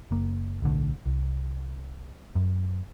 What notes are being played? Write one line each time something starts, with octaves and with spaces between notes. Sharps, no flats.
F#1 A#3
D1 B1 D3 A3
C2
F#2